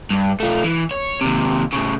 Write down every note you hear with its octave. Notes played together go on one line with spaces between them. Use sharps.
G2
A3 F4
E3
C#5
D#2 C3
A2 C#3